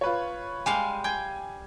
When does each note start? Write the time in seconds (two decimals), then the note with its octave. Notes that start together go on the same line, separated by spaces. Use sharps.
0.01 F4 B4 C#5
0.66 G3 G#3 F5 G#5 C7
1.04 G5 G#5 G#6